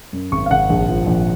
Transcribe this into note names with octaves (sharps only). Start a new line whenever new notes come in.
F#2
G#1 C#6
F5
G#1 F#5
A#1
F3
A#1